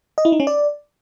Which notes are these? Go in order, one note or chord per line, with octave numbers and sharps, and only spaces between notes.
D#5
E4
D#4
C#4
D5